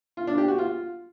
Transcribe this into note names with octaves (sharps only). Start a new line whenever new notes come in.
F4
D4
G4
F#4
F4